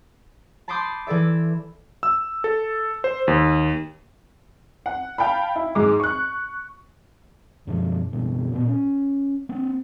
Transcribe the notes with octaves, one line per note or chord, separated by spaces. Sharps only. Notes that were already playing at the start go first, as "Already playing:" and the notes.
A5 B5 C6 D6 D#6 G6
E3 A4 D5 E5
E6
A4
C5
D#2
F#5
F5 G5 A5 B5
E4
G#2 G#3 D6
C#6 F#6
F#2 B2 F3
F#1 B2
A#2 A#3 B3
C#4
A#3 C4